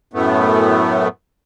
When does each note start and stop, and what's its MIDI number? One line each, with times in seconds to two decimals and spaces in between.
0.14 1.08 42
0.14 1.08 45
0.14 1.08 57
0.14 1.08 59